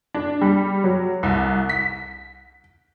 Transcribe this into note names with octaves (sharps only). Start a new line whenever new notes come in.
D4
G3
F#3
C2
B6